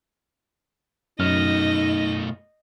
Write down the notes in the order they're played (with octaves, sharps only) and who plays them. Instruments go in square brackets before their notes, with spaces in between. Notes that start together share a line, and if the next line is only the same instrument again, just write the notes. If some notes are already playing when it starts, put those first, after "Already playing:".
[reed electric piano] F#2 F6 [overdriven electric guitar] B2 A3 [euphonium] D#4 [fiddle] D#5